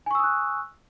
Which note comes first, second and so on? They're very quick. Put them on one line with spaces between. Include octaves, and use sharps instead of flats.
G#5 C#6 E6 D#6 F#6